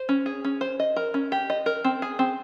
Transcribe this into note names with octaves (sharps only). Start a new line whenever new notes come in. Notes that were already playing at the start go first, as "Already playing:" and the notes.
Already playing: C5
C#4
G#4
C#4
C5
D#5
A#4
C#4
G4
D#5
A#4
C4
G#4
C4